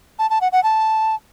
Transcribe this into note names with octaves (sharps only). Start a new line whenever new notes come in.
A5
A5
F#5
F#5
A5